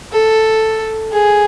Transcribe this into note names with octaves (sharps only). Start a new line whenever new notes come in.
A4
G#4